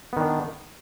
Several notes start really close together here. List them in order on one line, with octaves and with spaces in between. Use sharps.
B3 D#3 D4